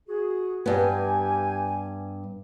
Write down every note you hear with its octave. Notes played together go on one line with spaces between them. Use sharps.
F#4 G#4
G2 B3 G4 G#5